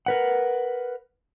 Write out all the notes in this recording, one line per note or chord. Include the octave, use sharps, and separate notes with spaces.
A#4 B4 F#5